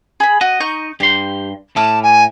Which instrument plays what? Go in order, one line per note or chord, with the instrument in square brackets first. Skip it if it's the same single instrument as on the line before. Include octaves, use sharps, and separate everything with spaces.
[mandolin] G#4 B5
[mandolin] F#4 [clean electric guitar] D#5
[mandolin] D#4 C#6 G6
[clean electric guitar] G2 C6 [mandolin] G4
[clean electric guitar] A2 [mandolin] E4 D6 F6 [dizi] A5
[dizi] G#5